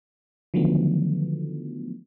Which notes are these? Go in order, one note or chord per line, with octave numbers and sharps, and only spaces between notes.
D3 D#3 F3 F#3 A3 B3